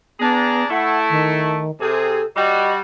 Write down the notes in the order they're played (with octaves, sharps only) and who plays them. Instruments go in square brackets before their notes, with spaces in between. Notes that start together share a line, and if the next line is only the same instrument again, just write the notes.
[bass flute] B3 [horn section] D4 G#4 A#5
[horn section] A3 E4 [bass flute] F#5
[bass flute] D#3
[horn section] C3 G#4 [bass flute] A4
[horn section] G3 F#4 [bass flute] D#5